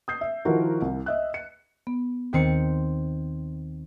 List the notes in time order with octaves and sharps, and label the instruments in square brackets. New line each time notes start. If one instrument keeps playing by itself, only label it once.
[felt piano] D#6 G6 C7
E5
D#3 F3 E4 F#4 A#4
C2
D#5 E5 F#6
C#7
[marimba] B3
[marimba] D#2 [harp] D#3 C4 C#7